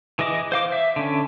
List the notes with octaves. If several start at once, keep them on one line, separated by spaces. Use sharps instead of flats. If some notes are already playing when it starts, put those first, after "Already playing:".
E3 G#4 D#5 D6
C5 F5 D6
E5
D3 C#4